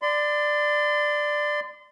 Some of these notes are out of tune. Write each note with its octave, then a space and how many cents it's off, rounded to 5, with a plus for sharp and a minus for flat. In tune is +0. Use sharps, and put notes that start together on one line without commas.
D5 +10 C6 -30